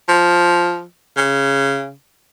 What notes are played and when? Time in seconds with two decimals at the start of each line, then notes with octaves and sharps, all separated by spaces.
0.09 F3
1.17 C#3